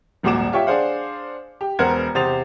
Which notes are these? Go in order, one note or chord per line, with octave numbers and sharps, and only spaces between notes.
D#1 G#1 A#2 F#4 D6 E7
F4 G4 C#5 E5 G5
D4 G#4 C5 F5 F#5
G4
E1 B3 A#4 C5 F#5 G#6
E2 C3 C5 D#6 A6 F7